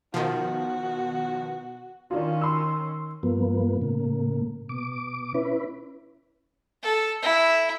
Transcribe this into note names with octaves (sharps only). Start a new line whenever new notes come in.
B2 D#3 F3 F#4
D#3 C#4 D4 F4
C6 E6
G2 F3 A#3 B3
A2 C#3 A#3
B2 D6
C#4 E4 B4
A4
E4